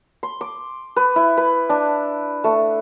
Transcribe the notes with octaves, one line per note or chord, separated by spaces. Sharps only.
C6
D6
B4
E4
B4
D4
A3